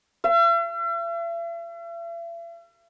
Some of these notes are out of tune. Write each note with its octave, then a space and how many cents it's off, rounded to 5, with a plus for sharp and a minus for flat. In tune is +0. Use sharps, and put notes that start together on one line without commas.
E5 +45